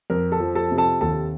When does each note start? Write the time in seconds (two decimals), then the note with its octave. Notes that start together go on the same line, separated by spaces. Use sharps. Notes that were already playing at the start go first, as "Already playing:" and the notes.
0.10 F2 A#4
0.32 A4 A5
0.40 F3
0.55 A4 A5
0.71 C3
0.78 A4 A5
1.01 D#2 A4 A5